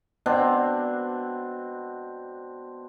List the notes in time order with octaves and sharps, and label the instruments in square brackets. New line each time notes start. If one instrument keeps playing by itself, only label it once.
[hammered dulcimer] B2 C4 D4